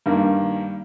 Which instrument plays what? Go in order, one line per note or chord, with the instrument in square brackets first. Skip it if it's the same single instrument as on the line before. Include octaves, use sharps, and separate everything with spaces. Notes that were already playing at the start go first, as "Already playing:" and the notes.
[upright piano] G2 D#3 A#3